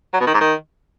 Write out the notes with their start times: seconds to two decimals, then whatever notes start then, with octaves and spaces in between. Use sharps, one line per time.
0.14 F#3
0.20 B2
0.27 D#3
0.34 G#2
0.41 D#3